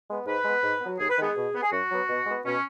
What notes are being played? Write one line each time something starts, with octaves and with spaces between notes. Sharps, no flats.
G#3 B3
G#2 B4
G#3 B3
G#2
B3
F#3
D#2 G#4
B4
D#3 G#3 B3 G#4
B2
B3
G#4
F#2 F#4
F#3 B3
B2
G#3 B3
B2 C#4